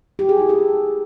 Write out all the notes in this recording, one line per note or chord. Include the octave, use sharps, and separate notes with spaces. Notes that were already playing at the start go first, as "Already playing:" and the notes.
G4
G#4
E4
A4